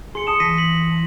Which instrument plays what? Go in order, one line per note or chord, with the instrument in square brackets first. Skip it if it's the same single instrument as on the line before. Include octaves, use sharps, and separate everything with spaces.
[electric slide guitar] G#4 [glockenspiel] C6 C#7
[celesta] A5 D#6 C#7 [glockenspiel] E7
[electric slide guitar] E3 [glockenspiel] A#6 B6 D#7
[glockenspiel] B6 F#7